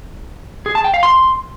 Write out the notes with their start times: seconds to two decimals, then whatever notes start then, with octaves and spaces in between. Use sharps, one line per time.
0.66 G#4
0.75 A5
0.84 G5
0.94 F5
1.03 C6